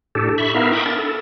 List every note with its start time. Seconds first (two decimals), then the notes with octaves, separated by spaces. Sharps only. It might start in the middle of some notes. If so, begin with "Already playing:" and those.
0.15 A2 D4 G4 A4
0.38 E5 B5 C#6
0.54 B3 D#4 E4 A#4 E5 F5
0.72 G5 B5 C#6 D#6
0.86 D4 A#4 A6
0.98 A4